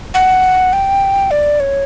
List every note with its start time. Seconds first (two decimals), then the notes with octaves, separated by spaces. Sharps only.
0.14 F#5
0.73 G5
1.31 D5
1.60 C#5